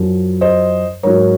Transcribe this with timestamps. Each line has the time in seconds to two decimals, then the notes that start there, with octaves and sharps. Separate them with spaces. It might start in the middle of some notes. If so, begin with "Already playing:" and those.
Already playing: F#2 F3
0.41 C5 D#5
1.03 G#2 F#3 A#4 C#5